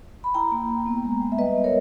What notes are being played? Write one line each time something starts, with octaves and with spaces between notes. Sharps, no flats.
B5
E4 G5 A#5
A#3
A#3
B3
G#3
G#3
E5
G3 B4 D#5
B3
A#4 C#5